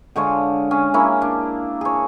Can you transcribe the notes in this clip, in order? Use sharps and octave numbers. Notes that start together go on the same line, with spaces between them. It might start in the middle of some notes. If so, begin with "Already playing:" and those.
D3 G#3 C#5 F5
C#4 G#4 G#5
A#3 C#4 E4
D4
G#4 C#5